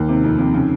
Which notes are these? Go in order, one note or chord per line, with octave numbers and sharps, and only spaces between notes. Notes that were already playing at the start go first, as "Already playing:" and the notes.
Already playing: D#2 D#4
C3
F2
F2
C#3